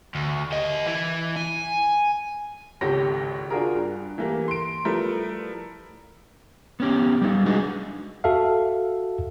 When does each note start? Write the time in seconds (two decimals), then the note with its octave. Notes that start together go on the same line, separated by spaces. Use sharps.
0.15 D2
0.52 G4 D#5
0.86 E3 E4
1.36 G#5
2.81 G#1 C#2 G4 A4 C#5 A#6
3.50 D4 F4 F#4 G#4 A#4
3.75 G2
4.18 E3 A3 A#3 G4
4.48 C6 D7
4.85 F3 G3 A3 E4 A#4 B4
6.80 B3 C#4 G4
7.22 G3 D#4
7.46 G#3 D4 F#4 G#4 B4 D#5
8.24 F#4 A4 E5 F5